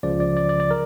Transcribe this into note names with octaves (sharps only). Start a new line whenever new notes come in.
C#2 C#3 F3 D5
D5
D5
D5
D5
A#4